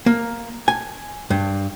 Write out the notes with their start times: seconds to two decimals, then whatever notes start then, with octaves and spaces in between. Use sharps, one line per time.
0.06 A#3
0.68 G#5
1.30 G2